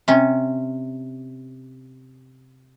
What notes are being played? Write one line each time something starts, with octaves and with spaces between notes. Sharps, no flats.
C3 C#4